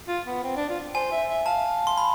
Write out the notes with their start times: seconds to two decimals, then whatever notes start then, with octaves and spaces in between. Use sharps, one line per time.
0.08 F4
0.26 B3
0.43 C4
0.56 D4
0.70 F4
0.94 C5 G#5
1.12 E5
1.29 E5
1.46 F5 A5
1.87 C6
1.97 B5